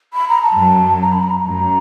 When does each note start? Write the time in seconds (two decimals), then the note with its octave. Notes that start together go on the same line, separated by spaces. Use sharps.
0.14 B5
0.29 A#5
0.42 A5
0.57 F#2 F#3
1.01 A#5
1.12 B5
1.24 A#5
1.44 F#2 F#3 A#5